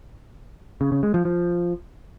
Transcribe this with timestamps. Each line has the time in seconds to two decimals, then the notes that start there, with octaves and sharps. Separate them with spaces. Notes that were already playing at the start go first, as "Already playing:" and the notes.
0.81 C#3
0.92 C#3
1.03 G#3
1.14 F3
1.25 F3